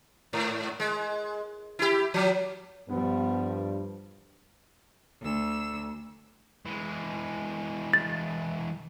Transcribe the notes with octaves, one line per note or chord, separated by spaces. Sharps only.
G#2
G#3
E4 G4
F3 F#3
G2 F3 G3 B3
D2 E6
E3 G#3
A6